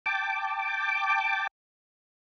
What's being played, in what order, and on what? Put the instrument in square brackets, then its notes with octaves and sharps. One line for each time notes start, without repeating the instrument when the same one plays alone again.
[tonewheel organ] G5 A5 D6